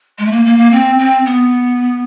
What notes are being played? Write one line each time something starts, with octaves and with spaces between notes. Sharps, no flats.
G#3
A3
A#3
A#3
A#3
C4
C4
B3